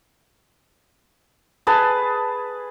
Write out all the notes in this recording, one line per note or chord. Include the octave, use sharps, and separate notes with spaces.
G#4 B4 A5